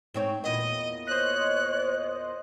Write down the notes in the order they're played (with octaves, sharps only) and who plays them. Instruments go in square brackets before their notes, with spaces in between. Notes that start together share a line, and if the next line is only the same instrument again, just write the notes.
[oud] G#2 C4 C#5
[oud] E2 A#2 B3 [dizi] D#5
[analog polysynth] C5 D#5 [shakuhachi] C#5 [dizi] F#6